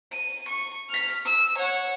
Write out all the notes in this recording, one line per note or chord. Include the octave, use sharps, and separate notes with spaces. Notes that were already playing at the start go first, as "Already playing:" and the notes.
D#7
C#6
F6 B6
E6
C#5 F#5